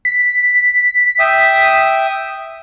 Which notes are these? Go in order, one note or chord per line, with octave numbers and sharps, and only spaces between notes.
B6
E5 G5 D#6